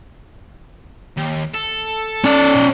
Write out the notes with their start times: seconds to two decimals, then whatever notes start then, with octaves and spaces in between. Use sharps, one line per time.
1.17 D#2
1.55 A4
2.24 C#4 D5
2.55 B1